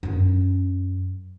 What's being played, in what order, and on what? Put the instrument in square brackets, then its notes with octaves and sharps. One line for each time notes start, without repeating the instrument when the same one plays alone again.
[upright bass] F#2 C#4